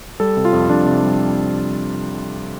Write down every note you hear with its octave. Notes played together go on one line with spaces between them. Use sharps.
G3 A4
C3
F4
F2
F2 D4
C3
G3